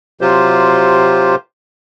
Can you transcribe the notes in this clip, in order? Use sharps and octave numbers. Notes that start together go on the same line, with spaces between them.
C3 F#3 F4 G4 C5